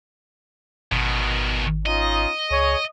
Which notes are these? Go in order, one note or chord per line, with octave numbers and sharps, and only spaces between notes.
G#1 B2 D#3
C#4 D#4 F4 D#5
C#2 G#4 C#5